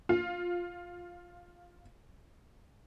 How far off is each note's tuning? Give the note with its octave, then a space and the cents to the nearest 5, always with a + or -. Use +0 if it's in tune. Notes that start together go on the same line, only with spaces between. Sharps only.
F4 +10